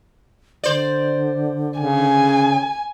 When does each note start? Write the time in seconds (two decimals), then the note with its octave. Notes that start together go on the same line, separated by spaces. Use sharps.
0.64 D3 C5 D5
1.80 C#3 G#5